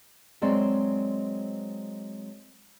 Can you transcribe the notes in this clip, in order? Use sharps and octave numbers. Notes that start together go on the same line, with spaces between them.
F#3 G#3 C4 D5